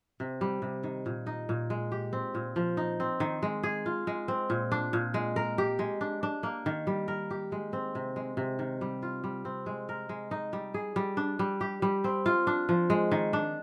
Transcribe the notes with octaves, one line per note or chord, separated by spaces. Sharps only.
C3
G3
C3
D#3
A#2
D#4
A#2
G#3
G4
C4
A#2
F3
D#4
C4
D#3
G#3
G#4
F4
G#3
C4
A#2
D4
A#2
G#3
A#4
G4
G#3
D4
D4
A#3
D#3
G3
A#4
G4
G#3
C4
C3
G#3
C3
D#3
G3
F4
G3
C4
G#3
A#4
G#3
D#4
G3
G#4
G3
D4
G3
G4
G3
C4
F4
D4
F3
G#3
D#3
D4